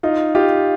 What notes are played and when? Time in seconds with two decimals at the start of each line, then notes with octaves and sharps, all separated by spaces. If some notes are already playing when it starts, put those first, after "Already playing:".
0.03 D#4 F4
0.35 F4 G4